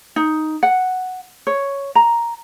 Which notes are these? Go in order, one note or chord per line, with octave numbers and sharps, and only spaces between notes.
D#4
F#5
C#5
A#5